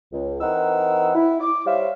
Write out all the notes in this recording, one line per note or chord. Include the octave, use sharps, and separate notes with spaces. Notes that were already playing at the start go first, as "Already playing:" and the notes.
C#2
E3 C4 D#4 A#4 F#5 E6
E4
D6
G3 C5 C#5 E5 F5